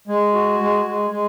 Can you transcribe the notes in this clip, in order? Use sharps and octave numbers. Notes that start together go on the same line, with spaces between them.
G#3
F#4
G#3
G#3
G#3